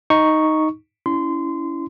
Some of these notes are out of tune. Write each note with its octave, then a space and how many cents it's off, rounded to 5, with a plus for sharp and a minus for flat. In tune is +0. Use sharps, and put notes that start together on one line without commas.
D#4 +0 C#6 +0
C#4 +25 E4 +0 C6 -20